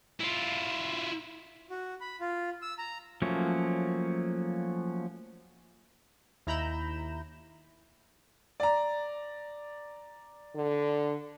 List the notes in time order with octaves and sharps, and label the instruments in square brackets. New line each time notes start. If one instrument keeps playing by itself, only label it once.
[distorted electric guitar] E4 F4
[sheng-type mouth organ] F#4
B5
F4
E6
A#5
[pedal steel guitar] F3 F#3 A3 A#3 C#4
[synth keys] D#2 E4 A#5 B5 G6 E7
[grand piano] D5 A#5
[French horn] D3